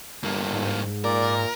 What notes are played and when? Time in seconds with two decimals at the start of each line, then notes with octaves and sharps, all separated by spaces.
0.23 G1 G2 A#3
0.53 G#2
1.04 A#2 A#4 D5